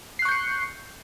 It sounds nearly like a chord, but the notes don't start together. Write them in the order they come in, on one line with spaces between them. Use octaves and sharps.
C7 F#6 C#6 G6 C#7